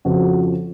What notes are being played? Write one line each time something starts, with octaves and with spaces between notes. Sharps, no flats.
F2 C#3 F3 F#4